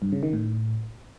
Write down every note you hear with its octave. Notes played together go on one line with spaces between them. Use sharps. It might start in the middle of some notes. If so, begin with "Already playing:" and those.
G2
C#3
D#3
A2